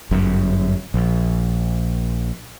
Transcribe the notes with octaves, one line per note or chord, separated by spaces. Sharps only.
G1 F#2
A#1